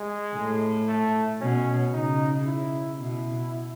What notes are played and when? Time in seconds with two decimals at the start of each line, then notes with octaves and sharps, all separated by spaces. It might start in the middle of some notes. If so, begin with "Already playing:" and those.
Already playing: G#3
0.36 A2
0.88 A3
1.40 B2 C#4
1.93 C#3 D#4
2.46 E4
2.98 B2 E4